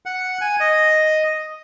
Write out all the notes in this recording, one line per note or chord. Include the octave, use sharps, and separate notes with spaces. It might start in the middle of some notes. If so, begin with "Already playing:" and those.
F#5
G#5
D#5